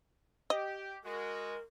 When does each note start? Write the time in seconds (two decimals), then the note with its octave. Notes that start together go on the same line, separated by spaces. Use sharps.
0.50 G4 D#5
1.04 G#3 F#4 A#4